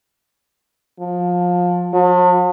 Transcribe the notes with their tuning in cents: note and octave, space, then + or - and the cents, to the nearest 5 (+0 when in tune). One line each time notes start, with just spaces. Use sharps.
F3 +25
F3 +45